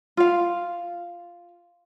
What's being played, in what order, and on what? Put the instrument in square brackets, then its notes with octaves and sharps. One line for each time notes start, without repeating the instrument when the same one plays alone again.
[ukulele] F4 F5